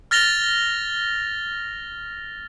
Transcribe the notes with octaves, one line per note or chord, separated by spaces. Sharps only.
F6 A6 A#6 F7 G7